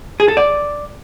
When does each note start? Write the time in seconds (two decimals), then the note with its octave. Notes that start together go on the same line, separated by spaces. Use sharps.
0.20 G#4
0.28 A4
0.37 D5